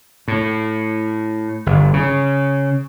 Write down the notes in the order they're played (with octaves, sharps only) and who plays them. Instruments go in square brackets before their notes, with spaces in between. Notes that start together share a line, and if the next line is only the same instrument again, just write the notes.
[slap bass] A2
G1
C#3